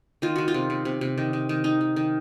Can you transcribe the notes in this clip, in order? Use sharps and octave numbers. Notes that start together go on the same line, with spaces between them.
D#3 F4
D#3 F#4
F4
C3
C3
C3
C3
D#3
D#3
D#3
D#3 D#4
D#3
D#3